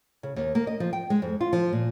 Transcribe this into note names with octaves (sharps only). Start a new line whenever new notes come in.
C#3
D#2
A#3
D#5
F3
G5
G#3
F2
F4
F3
A#2